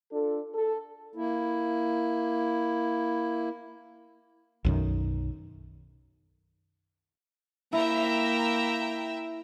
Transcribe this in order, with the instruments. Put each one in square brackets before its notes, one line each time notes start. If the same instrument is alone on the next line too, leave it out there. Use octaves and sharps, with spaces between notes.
[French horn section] D4 F4 A4
A4
[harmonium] A#3 E4
[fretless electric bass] B1 F#2 D#3
[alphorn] A#3 [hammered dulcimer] E4 [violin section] E5 G5 A#5